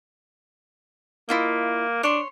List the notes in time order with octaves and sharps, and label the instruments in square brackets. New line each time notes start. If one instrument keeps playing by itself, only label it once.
[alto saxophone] A#3 [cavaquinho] E4 F4 D#5
[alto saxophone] D4 [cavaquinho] C#5 C6